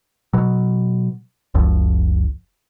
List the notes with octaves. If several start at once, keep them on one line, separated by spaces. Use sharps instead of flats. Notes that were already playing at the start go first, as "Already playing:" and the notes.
B2 F#3
F#1 C#2 F#2 F3